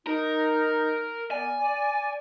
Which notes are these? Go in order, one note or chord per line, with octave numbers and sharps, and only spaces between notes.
D#4 A#4
B3 A#4 D5 G#5
D5